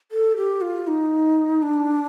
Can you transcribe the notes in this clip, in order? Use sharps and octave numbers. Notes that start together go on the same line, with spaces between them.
A4
G4
F4
D#4
D4